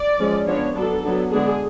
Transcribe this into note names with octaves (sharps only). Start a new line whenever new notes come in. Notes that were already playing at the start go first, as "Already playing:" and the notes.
Already playing: D5
F3 G#3 C#4
F3 B3 D4 C#5
F#3 B3 D4 A4
F#3 B3 D4
D3 G#3 B3 D4 G#4